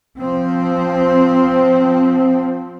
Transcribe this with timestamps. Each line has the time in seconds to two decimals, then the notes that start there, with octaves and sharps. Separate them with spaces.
0.18 F3 C4